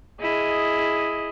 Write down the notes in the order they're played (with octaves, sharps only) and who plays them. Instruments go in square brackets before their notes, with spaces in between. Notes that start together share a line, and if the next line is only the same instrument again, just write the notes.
[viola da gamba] E4 G#4 D#5